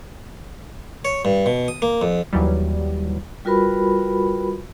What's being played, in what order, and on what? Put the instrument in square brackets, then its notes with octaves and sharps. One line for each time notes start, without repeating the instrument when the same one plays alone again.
[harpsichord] C#5
G2
B2
D#6
A#3
F2
[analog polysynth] D#2 E3 F#3 G3
[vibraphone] G3 F4 F#4 A#4 B4 B5